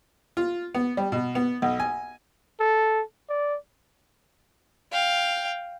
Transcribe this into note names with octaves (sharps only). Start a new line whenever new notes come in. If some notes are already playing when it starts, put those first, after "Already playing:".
F4
B3
G3
B2
B3
B1
G#5
A4
D5
F5 G5